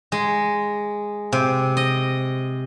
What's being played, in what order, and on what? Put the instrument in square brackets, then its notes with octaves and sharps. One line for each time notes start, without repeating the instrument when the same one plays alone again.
[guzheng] G#3
C3
D#5